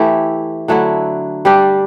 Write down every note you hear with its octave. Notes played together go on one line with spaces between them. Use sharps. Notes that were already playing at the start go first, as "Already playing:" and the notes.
Already playing: E3 A3 E4 G4
D3 F#3 A3 E4
G3 D4 G4 D5